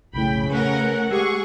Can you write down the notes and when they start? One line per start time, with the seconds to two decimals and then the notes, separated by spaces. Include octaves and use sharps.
0.14 B1 F2 A2 C#3 G5 B5
0.50 A3 C#4 A#4 B4 F#5
1.11 G#3 G4 G#4 C#6 E6